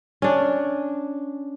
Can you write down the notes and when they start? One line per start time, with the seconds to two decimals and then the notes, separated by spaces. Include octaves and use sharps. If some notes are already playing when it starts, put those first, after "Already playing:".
0.22 C#4 D4